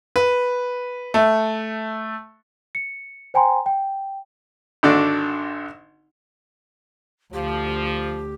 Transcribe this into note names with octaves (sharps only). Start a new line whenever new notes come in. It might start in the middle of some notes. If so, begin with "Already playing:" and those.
B4
A3
C#7
C5 G5 G#5 A#5 C6
G5
G#1 D3 D4 F#4
D2 F3 G4